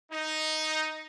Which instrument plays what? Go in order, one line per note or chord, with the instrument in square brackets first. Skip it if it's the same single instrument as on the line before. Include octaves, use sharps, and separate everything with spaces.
[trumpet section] D#4